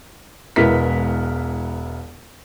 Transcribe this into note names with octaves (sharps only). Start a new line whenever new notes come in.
E1 G#3 B3 E4 A#4 B6